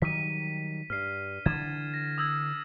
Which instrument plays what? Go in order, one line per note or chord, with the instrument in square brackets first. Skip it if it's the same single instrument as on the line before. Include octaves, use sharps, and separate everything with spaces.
[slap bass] D#3 F#3 G3 [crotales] B6 D#7
[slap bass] G2 [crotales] F6 C7
[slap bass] D3 E3 [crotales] G#6 A6 E7
[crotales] A#6
D#6 E6 G#6